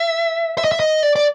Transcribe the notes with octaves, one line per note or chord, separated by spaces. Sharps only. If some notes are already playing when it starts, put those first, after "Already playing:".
Already playing: E5
E5
D#5
E5
D#5
D5
D5